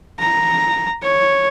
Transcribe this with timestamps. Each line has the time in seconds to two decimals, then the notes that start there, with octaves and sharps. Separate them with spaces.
0.20 A#5
1.03 C#5